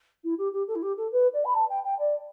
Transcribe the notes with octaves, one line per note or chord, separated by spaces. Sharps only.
E4
G4
G4
A4
E4
G4
A4
B4
D5
B5
A5
G5
G5
D5